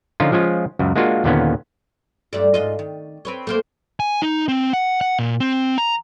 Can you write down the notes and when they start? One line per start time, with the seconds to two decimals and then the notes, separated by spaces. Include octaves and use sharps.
0.20 D3 F3 C#4 D#4 F4
0.32 F3 G#3 C#4 F4
0.79 C#2 F#2
0.96 G#3 A#3 D4 F4 F#4 G#4
1.24 D#2 A#2 D3 A#3 B3 C#4
2.33 G2 A3 D5
2.54 G#2 F4 D#5
2.79 D#3
3.25 C4 B4 C#5
3.47 A3 A#3 C4
4.00 G#5
4.22 D#4
4.48 C4
4.73 F#5
5.01 F#5
5.19 A#2
5.40 C4
5.78 A#5